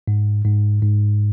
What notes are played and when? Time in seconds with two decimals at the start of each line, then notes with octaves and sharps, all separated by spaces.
0.08 G#2
0.45 G#2
0.83 G#2